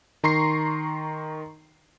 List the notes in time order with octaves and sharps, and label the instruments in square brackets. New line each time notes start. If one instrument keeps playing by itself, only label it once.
[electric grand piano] D#3 A#5 C6 C#6 C7